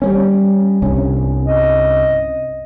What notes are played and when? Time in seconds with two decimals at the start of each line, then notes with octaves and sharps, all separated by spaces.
0.02 G3 A3 C#4
0.82 C2 G2 C#4
1.47 D#5